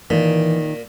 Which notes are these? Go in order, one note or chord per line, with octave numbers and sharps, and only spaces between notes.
A#2 D#3 E3